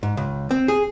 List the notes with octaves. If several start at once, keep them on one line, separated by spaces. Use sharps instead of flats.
G#2
C#2
C4
G#4